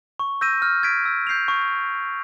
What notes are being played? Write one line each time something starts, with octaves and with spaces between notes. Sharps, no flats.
C#6
E6 G6 A#6 D#7
F6
G#6 B6 D7
E6
G6 C7 F7
C#6